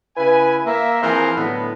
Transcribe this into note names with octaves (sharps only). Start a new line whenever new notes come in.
C#3 E4 B4 G#5
A#3 E5
E3 F3 C4 G#4 A#4 C5
A2 D3 F#3 B3